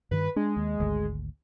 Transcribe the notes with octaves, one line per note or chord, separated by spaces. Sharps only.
G2 D#3 B4
G#3 D4
D#2
G#1 D2